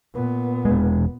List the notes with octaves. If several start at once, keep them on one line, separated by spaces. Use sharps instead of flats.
A#2 B3
E1 G#3